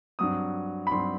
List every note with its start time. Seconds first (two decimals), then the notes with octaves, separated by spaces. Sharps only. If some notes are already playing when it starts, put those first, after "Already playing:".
0.19 G2 F#3 C4 D#6
0.87 B5
0.92 G2 F#3 C4 C6